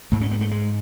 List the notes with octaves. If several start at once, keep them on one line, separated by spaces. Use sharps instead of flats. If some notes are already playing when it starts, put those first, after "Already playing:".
G#2 A3
C#4
B3
A3
G#3